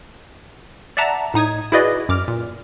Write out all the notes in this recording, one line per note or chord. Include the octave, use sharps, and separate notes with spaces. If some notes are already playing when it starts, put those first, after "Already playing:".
D5 E5 F#5 A5 A#5
A2 D#4 D#6 G#6
E4 F#4 G#4 B4 D5 D#5
F#2 D6 F6
A#2